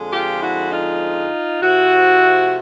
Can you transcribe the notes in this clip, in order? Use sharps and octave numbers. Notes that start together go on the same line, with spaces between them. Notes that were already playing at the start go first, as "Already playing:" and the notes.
Already playing: F2 D3 F3 G#3
F4 G4
E4 F#4
D#4 F4
C3 F3 A3 E4 F#4